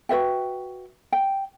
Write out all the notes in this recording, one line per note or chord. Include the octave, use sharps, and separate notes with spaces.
F#4 B4 E5 G5
G5